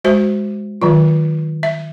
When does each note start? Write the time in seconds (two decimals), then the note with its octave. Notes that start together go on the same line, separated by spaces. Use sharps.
0.04 G#3 F#4 C5 E5
0.82 D#3 F#3 F4
1.63 E5